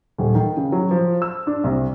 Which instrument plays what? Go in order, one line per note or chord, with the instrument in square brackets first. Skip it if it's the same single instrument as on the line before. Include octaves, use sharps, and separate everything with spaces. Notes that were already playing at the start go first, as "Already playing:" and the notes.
[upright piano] D#1
D#3
C#3
F#3
F3
E6
D4
C2